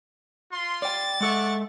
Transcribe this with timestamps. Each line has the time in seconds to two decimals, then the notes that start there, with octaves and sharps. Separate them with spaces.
0.52 F4 C6
0.82 D5 G5 A6
1.21 G#3 A4 D5 E5 F#5 C#6